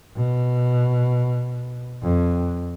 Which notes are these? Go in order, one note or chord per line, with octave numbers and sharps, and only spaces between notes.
B2
F2